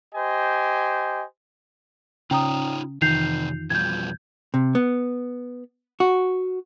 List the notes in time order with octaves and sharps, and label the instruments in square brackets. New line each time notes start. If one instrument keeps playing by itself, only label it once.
[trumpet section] G4 C5 D#5 G#5
[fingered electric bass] C#3 [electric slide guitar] D#4 F4 C#5 [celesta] G5 A#5 D#6
[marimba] F2 E3 [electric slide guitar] C3 D#4 [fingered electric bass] D#3 [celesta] G6 C7 F7
[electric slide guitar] B2 F3 G3 [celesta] G6 G#6
[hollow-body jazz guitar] C3
B3
F#4